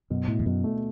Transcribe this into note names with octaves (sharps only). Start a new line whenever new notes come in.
F#2 B2
A2 E4
E2
F#2 B2
A3